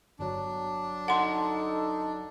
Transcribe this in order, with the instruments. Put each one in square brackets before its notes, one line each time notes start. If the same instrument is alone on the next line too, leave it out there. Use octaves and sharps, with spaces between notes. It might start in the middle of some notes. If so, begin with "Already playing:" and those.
[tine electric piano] G1 F#3 [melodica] D4
[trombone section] D#4 A4 [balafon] F#5 C6